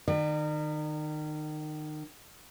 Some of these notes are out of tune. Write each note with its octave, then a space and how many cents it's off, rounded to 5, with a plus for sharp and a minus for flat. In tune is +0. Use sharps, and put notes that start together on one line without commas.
D#3 -25 D5 +40